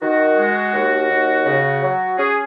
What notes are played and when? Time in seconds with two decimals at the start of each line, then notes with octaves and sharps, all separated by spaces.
0.01 D#3 F#4
0.37 G#3
0.73 D#2
1.10 D#2
1.46 C#3
1.82 F#3
2.18 C#4 G#4